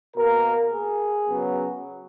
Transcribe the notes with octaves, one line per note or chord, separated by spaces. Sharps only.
B2 A#3 A#4
G#4
C#3 F#3 B3